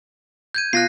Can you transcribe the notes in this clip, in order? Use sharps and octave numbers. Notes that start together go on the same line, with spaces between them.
G6 G#6 D#7
B2 F4 F#6 A#6 C7